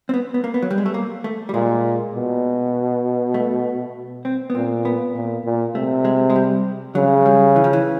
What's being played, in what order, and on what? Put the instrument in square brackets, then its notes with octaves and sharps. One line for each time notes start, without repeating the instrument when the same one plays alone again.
[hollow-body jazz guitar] C4
B3
B3
A#3
B3
F#3
G3
G#3
A3
A#3
A3
G3
[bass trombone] A#2 [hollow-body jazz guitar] G#3
[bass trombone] B2
[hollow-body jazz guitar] A3
C4
B3
[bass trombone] A#2 [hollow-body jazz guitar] C4
[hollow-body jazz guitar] B3
[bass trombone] A#2
A#2
[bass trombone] C3 [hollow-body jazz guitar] A3
[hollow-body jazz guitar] G#3
G#3
G3
[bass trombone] C#3 [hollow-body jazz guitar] F#3
[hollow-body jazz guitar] G3
E3
F3
E3